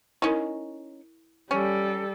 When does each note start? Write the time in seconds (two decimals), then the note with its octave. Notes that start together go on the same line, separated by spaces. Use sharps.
0.22 C#4 D#4 E4 A#4
1.51 G3 C#4 A4